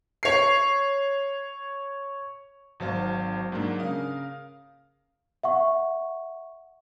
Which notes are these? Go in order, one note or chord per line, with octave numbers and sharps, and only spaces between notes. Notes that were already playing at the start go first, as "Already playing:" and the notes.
C#5 C7
G#1 F#3 C5 F5 A5 F6
G#2 F#3 A#3 D4
C#3 A#4 F5 D#6
E5 F#5 C#6